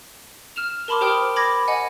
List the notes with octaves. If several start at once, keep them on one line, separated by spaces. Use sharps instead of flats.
F6 E7 F7
A#4 A5 B5 C6 D6
G4 A#4 C5 G5 D#6 F6
B5 D6 G#6 A#6
D#5 F#5 G#5